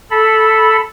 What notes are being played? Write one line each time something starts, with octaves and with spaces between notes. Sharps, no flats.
A4 B5